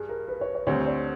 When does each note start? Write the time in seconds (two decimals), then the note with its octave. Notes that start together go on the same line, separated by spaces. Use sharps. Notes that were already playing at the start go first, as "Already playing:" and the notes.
Already playing: G2 G3 G#4
0.09 A#4
0.28 B4
0.41 C#5
0.55 C#5
0.67 D2 D3 G3 C4 C#5
0.86 D5